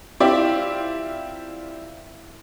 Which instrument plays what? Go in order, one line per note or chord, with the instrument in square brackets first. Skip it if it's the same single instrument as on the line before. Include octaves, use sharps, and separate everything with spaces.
[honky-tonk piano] C4 E4 F4 G4 D5